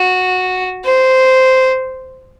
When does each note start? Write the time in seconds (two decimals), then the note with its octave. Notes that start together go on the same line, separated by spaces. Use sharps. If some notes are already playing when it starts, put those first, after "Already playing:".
Already playing: F#4
0.85 C5